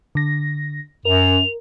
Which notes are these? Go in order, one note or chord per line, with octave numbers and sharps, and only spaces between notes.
D3 A#6
F#2 A#4 F7